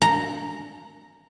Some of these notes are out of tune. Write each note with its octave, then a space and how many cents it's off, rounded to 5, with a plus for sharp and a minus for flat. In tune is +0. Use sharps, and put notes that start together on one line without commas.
A#5 -5